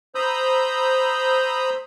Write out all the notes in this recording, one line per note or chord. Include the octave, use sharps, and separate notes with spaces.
C5 A#5 B5 D#6 E6 G6